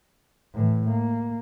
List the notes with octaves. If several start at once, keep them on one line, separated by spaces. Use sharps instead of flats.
A2 E3
A#3